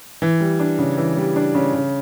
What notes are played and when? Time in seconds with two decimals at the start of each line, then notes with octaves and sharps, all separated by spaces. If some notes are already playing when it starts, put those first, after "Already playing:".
0.22 E3
0.40 G3
0.60 D4
0.79 C#3
0.98 E3
1.17 G3
1.36 D4
1.55 C#3
1.74 C#3